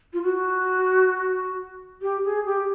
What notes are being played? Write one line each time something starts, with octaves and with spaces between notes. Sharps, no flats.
F4
F#4
G4
G#4
G4